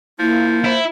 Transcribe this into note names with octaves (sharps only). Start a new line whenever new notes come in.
F3 A#3 E4
E4 C5